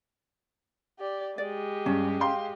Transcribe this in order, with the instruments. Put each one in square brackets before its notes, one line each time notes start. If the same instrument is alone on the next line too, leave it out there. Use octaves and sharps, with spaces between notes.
[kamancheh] G4 D5
[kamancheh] G#3 G4 [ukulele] D5
[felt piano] G2 [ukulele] C#4
[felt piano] F5 G5 C6